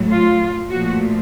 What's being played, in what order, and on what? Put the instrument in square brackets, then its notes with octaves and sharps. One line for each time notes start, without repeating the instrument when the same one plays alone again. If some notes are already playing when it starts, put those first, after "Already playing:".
Already playing: [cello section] A2 F#3 A3
F4
A#2 F3 A3 F#4